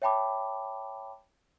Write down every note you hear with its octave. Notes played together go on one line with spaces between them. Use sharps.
C#5 E5 G5 A5 B5 D6